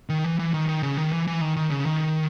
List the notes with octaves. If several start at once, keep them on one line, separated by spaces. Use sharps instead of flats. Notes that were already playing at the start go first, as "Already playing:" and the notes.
D#3
E3
E3
D#3
D#3
C#3
D#3
E3
E3
D#3
D#3
C#3
D#3